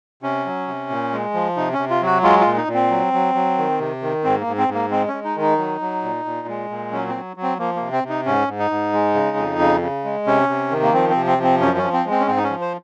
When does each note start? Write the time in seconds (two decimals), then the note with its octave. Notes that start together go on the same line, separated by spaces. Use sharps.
0.23 C3 C#4
0.46 F#3
0.68 C3
0.90 A#2
1.12 G#3
1.34 F3
1.57 C3 D#4
1.73 C#4
1.78 C3
1.90 F4
2.02 F#3 F#4
2.23 G#3 F4
2.41 F4
2.46 A#2
2.57 D#4
2.68 A#2
2.74 C4
2.91 F#3
3.13 F#3
3.35 F#3
3.58 D#3
3.79 C3
4.02 D#3
4.24 G#2 C4
4.41 A#3
4.47 G#2
4.58 C4
4.68 G#2
4.74 A#3
4.91 G#3 C4
5.08 C#4
5.13 G#3
5.25 D#4
5.36 D#3
5.41 D#4
5.58 F#3
5.81 F#3
6.03 A#2
6.25 A#2
6.48 G#3
6.70 A#2
6.92 F#3 C#4
7.09 C4
7.14 F#3
7.37 F#3
7.42 C4
7.59 F3 A#3
7.76 C3 A#3
7.92 C4
8.04 C3
8.09 D#4
8.26 G#2 C#4
8.48 G#2
8.59 D#4
8.71 G#2
8.93 G#3
9.14 C#3
9.37 F2
9.59 C#3
9.82 C#3
10.04 G#3
10.27 C3 C#4
10.49 C3
10.71 D#3
10.83 A#3
10.94 F3 C4
11.10 C4
11.16 C3
11.27 C4
11.38 F3
11.44 C4
11.61 F#2 C#4
11.78 C#4
11.83 F3
11.93 C4
12.05 G#3
12.11 C4
12.20 C#4
12.27 G#2 C4
12.37 D#4
12.44 C#4
12.50 F3
12.61 C5